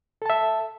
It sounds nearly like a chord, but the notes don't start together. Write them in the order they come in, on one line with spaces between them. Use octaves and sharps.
A4 A5 E5